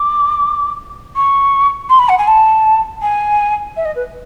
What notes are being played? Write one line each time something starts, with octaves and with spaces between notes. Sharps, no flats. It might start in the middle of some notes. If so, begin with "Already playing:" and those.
Already playing: D6
C#6
C6
B5
F#5
G#5
A5
G#5
E5
D#5
B4